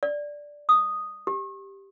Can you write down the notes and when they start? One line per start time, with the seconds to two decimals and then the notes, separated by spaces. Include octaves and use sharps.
0.03 D5
0.69 D#6
1.27 G4